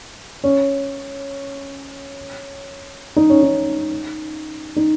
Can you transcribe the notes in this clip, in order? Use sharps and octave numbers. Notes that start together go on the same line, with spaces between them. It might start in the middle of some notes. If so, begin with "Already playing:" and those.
C#4
D#4
C#4
D#4
D#4